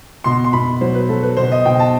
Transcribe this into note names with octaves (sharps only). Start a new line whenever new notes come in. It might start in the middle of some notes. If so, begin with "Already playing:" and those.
B2 C6
C6
B2 B5
F#3 C5
B4
F#3 A4
B4
B2 C5
D#5
B2 G5
A5